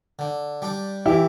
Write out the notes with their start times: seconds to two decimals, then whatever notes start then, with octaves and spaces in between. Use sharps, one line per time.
0.19 D3
0.62 G3 D4
1.06 E3 E4 G4